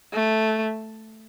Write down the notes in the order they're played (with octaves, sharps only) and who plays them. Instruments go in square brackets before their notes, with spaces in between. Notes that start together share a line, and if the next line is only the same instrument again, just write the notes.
[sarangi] A3